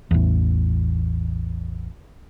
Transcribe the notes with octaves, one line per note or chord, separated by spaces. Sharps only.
A1 E2